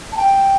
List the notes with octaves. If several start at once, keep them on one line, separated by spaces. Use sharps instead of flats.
A5
G5